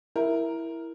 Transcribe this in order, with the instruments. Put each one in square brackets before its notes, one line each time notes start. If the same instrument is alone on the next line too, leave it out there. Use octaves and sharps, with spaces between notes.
[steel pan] E4 [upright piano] A#4